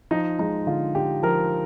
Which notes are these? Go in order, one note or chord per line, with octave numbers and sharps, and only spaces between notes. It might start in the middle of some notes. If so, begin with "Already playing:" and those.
F3 D#4
G#3 D#4
D3 F4
D3 G4
F3 A#4